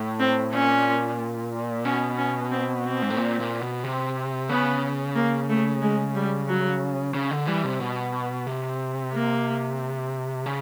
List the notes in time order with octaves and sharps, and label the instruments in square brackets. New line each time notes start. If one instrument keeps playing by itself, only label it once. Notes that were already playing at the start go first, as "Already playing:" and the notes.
Already playing: [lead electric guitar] A2
[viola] C4
[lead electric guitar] A#2 [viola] C#4
[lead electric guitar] B2 [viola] C#4
[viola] C#4
C4
C4
[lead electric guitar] G#2
A2
A#2
A#2
B2
C3
[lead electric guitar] C#3 [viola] B3
[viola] A#3
A3
G#3
G3
F#3
[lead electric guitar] C#3
D3
[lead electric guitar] E3 [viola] G3
[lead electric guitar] C3
B2
C3
[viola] A#3
[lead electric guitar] C#3